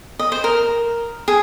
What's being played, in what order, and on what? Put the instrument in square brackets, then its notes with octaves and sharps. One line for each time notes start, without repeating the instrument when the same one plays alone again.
[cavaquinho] D#5
C5
A#4
G#4